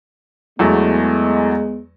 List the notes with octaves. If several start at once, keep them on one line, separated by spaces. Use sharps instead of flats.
E2 F#3 G#3 A3 B3